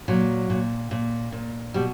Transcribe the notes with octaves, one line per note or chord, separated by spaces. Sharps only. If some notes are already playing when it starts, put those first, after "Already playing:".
A#2 F#3
A#2
A#2
A#2
B2 G3